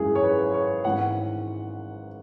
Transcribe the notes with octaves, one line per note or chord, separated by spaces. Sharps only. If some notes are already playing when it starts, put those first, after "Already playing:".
Already playing: G#1 F#2 E3 G#4
C#5
B4
C#5
G#1 G#2 E3 F#5